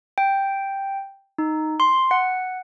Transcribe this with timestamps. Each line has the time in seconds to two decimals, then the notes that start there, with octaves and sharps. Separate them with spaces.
0.18 G5
1.38 D#4
1.80 C6
2.11 F#5